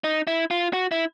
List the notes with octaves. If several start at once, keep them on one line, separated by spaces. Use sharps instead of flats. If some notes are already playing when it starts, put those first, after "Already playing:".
D#4
E4
F4
F#4
E4